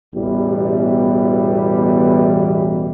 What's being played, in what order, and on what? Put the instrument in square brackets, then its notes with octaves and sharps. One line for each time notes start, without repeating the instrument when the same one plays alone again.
[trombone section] A1 E2 B2 E3 G3